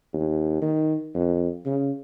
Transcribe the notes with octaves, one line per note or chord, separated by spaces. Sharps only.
D#2
D#3
F2
C#3